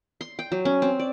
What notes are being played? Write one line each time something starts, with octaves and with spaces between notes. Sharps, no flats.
C6
G5
F#3
C#4
C4
D5